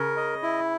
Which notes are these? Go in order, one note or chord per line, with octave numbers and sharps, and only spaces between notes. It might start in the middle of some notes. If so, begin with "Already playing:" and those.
Already playing: C#3 A#4
D#5
E4